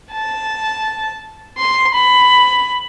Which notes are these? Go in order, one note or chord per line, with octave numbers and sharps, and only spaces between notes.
A5
C6
B5